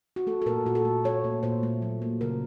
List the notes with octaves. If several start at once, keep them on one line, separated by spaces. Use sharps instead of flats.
F#4
A3 A4
A4
A#2 A#4
A#2 F#4
A4
A3
A3 C#5
A#2
A#2 C5
A3
F#3
A#3
C#3 A#4